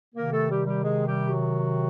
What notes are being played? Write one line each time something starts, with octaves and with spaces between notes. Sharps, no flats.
C3 D#3 A#3 A#4
A3 A4
G3 G4
G3 G4
G#3 G#4
G3 G4
F#3 F#4